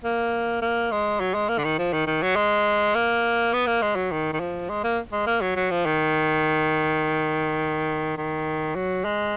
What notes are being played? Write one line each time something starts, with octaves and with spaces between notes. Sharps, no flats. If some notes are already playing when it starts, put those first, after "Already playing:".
A#3
A#3
G#3
F#3
G#3
A#3
D3
D#3
F3
D#3
D#3
F#3
G#3
A#3
B3
A#3
G#3
F#3
D#3
D#3
F3
G#3
A#3
G#3
A#3
F#3
F#3
F3
D#3
D#3
F#3
G#3